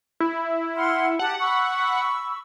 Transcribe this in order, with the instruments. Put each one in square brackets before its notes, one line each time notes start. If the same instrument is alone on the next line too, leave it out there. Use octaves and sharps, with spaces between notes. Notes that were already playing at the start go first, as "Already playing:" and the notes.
[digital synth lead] E4
[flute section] F#5 C6 F6
[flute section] G4 A5 [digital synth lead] F#5
[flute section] B5 C#6 E6